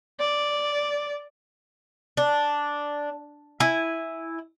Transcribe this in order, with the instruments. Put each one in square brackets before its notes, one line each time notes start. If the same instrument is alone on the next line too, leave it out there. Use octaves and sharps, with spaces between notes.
[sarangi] D5
[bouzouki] D4
E4 G#5